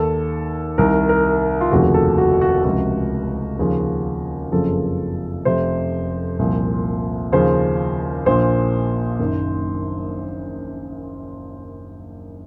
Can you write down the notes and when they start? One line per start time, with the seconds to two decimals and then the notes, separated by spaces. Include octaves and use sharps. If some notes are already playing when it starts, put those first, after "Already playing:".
Already playing: D#2 D#3 A4
0.78 C2 C3 D#3 A#4
1.09 A#4
1.61 F4
1.71 F1 D#2 C#3 F3 F#4
1.94 A4
2.18 F#4
2.41 F#4
2.64 C#2 C3 F3 F#4
3.59 D#2 C#3 F3
4.52 F#1 F2 C#3 F3 A4
5.45 F1 F2 C3 C5
6.39 C2 A#2 F3
7.32 D#2 C#3 F3 C5
8.26 A#1 A#2 F3 C5
9.19 F#1 F#2 D#3